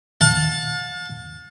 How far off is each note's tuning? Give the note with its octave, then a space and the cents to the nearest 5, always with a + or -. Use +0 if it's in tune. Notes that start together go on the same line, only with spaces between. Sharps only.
F5 +45 A5 +0